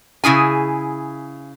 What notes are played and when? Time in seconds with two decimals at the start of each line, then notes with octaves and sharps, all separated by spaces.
0.24 C#3 E4 G#4 G#5